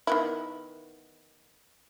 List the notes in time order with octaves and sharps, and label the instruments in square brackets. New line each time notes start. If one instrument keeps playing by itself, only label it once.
[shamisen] D#3 B3 E4